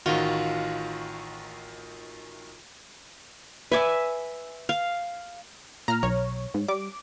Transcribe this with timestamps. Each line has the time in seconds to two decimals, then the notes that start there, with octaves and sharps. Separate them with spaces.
0.06 A1 D#3 F4 F#4
3.72 B4 D5 E5 G#5
4.69 F5
5.88 A#2 A#5 F6
6.03 B1 C#5
6.54 G#2
6.68 G3 D6